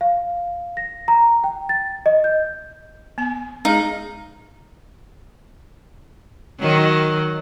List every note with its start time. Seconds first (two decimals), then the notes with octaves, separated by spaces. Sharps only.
0.01 F5
0.77 A#6
1.08 A#5
1.44 G5
1.69 A6
2.06 D#5
2.24 G6
3.18 B3 G#5
3.65 G#3 D#4 G#4
6.60 D#3 F#3